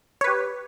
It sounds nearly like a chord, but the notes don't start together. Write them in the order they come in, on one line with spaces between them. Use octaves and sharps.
C#5 B4 G4